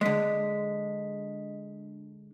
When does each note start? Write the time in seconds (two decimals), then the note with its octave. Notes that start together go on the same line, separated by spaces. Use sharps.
0.01 D3 G#3 D#5 B6